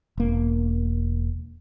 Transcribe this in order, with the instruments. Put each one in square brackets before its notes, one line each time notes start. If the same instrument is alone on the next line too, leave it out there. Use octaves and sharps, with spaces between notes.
[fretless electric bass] E1 A#3